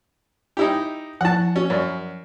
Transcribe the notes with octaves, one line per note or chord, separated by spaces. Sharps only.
D#4 E4 G4
F3 E4 F#5 A5
C#4 F#4
F#2 C#5 D5